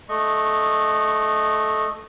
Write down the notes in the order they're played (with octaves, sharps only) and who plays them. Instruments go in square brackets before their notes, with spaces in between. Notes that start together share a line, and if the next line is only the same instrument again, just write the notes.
[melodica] A3 D#5 C#6